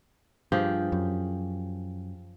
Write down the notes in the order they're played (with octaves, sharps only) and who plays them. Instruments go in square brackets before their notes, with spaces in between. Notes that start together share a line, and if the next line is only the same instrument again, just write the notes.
[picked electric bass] G2 [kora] F3 G4 G#4
[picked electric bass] F#2